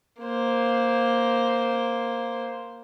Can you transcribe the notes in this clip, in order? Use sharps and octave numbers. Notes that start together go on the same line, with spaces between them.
A#3 C5